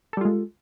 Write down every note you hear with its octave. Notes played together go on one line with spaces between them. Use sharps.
G3 G#3 F4 A4